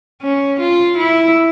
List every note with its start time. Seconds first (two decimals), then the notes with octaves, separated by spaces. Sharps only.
0.22 C#4
0.60 F4
0.98 E4